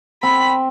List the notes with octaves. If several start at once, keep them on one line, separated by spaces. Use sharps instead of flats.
C4 B5